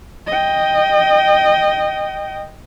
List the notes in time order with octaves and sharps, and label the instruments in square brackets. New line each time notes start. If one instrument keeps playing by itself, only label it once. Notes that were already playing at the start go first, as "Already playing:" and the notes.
[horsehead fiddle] D#5 G5